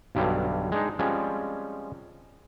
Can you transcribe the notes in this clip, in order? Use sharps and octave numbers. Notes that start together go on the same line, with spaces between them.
B1 G2 D3 F#3 G3 F5
G#3 D4 D#4
F3 G3 G#3 C4 C#4